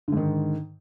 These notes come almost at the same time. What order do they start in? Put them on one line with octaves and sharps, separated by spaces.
D3 G#2 D#3